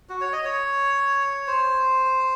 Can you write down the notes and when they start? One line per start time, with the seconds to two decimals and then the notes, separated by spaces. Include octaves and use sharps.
0.09 F#4
0.21 C#5
0.33 D#5
0.44 C#5
1.47 C5